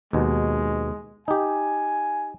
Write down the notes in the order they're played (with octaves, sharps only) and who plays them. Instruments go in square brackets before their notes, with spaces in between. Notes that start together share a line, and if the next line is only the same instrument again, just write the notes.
[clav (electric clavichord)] D#2 B2 [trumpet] G#3
[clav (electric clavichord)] D#4 G4 [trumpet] G#5